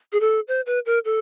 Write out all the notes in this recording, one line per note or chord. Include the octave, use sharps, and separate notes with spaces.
G#4
A4
C5
B4
A#4
A4